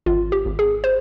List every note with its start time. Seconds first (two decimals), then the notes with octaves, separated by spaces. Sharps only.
0.06 G#1 F4
0.32 G4
0.45 G#1
0.59 G#4
0.84 C5